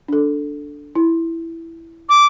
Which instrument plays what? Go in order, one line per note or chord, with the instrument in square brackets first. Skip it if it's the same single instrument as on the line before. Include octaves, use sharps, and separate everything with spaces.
[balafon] D4 A4
E4
[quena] D6